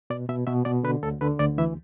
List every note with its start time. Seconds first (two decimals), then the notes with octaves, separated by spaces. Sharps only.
0.10 B2 D5
0.29 B2 E5
0.47 B2 E5
0.65 B2 D5
0.83 D3 B4
1.03 D2 A4
1.21 D3 B4
1.39 D2 D5
1.58 E3 E5